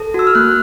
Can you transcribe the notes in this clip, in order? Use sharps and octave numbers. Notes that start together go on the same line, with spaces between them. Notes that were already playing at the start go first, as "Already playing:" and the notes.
Already playing: A4
F#4 E6
F6
A#3 F#6